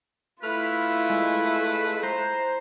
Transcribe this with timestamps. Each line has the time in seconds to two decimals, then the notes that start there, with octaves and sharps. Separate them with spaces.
0.43 A3 E4 F4 B4 F6
1.10 G#3
2.03 C5 A#5